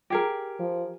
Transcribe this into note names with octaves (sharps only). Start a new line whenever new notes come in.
G4 G#4 A#4
F3